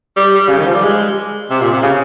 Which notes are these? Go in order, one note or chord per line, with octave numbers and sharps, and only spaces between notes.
G3
G3
C#3
D#3
F3
G3
G#3
C3
A#2
C3
C#3